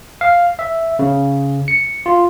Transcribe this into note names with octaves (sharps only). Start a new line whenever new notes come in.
F5
E5
C#3
C#7
F4